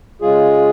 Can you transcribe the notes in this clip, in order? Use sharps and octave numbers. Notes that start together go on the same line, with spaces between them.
C#3 G#3 F4 G#4